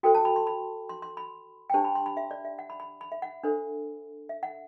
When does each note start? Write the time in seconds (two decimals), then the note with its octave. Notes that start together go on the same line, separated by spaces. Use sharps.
0.03 F#4 A4 C5 G5
0.15 A5
0.25 B5
0.36 C6
0.47 B5
0.89 C6
1.02 C6
1.17 B5
1.70 G5
1.74 D4 G4 C5 A5
1.85 B5
1.95 C6
2.06 B5
2.17 E5
2.31 D5
2.45 E5
2.59 F#5
2.70 B5
2.80 B5
3.01 B5
3.12 E5
3.22 F#5
3.43 D4 A4 C5
4.29 E5
4.43 F#5